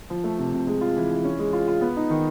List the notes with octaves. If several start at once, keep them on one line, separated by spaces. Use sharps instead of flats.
F3
A3
C3
C3
G#3
F4
E3
E3
C#4
G#3
F4
F4
B3
D#4
D#3